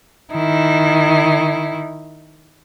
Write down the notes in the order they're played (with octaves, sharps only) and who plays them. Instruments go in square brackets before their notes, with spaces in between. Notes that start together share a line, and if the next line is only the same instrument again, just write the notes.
[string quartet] D#3 E4